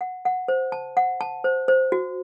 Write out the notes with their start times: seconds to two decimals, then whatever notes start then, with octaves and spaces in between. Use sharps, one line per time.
0.01 F#5
0.25 F#5
0.48 C5
0.72 A5
0.97 F#5
1.21 A5
1.44 C5
1.68 C5
1.92 F#4